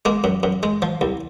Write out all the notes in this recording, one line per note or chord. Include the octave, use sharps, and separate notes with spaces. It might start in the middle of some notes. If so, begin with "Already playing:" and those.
G#3 A#3
F#2
F#2
G#3
F3
C2